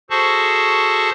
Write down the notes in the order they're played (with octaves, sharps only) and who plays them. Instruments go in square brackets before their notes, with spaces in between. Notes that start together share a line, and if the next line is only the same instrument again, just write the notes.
[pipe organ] F#4 G#4 A4 C5 A5 C#6